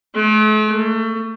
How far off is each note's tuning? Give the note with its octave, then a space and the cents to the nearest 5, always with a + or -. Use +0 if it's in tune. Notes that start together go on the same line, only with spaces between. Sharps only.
A3 -45
A3 +30